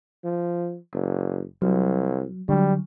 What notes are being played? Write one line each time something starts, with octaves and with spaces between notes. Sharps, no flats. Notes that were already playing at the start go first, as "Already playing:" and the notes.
F3
F#1
C2 F#3
D3 F#3 G3